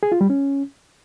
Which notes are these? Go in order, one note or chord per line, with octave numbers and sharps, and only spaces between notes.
G#4
F4
G3
C#4